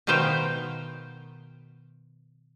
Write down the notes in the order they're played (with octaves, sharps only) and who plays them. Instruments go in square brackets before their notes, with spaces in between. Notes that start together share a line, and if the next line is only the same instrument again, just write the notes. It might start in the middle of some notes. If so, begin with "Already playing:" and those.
[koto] B2 D#3 B4 C5 F5 G5